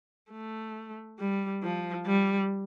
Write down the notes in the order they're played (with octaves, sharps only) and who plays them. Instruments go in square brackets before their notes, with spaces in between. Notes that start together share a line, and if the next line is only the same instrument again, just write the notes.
[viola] A3
G3
F3
G3